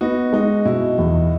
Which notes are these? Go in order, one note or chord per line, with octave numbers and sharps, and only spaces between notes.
B3 D#4 F#4
G#3 D#4
B2 E4
E2